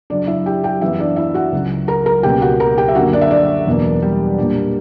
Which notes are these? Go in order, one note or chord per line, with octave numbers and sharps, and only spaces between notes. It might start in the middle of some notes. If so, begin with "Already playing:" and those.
F#2 C#3 F#3 D4 D5
E4 E5
G4 G5
G4 G5
F#2 E3 B3 E4 E5
D4 D5
E4 E5
F#4 F#5
C#2 C#3 F#3
A#4 A#5
A#4 A#5
C#2 B2 A#3 C#4 G4 G5
F#4 F#5
A#4 A#5
G4 G5
E5
F#2 D3 A#3 F#4 F#5
D4 D5
E5
D4 D5
E2 B2 F#3 A#3
G3 G4
A#2 A#3 D4